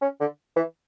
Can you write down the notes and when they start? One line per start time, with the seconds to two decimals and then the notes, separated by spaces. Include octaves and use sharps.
0.02 C#4
0.20 D3
0.56 E3